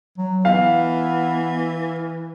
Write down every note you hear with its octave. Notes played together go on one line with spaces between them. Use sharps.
F#3
E3 B3 F5